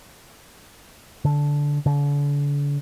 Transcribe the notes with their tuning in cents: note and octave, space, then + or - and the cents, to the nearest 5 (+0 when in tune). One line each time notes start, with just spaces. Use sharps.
D3 -10
D3 -40